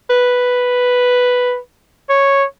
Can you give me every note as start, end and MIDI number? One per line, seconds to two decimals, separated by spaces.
0.10 1.57 71
2.09 2.44 73